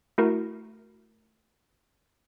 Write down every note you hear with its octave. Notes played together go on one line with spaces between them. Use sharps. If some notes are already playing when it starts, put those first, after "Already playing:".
A3 E4 F#4 A#4